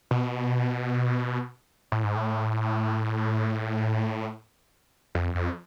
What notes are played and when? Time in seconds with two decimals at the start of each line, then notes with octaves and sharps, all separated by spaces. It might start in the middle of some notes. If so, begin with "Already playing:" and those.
0.11 B2
1.92 A2
2.04 G#2
2.16 A2
5.15 F2
5.35 F2